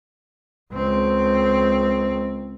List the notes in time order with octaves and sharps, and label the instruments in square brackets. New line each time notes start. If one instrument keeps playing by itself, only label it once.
[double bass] C#2 C4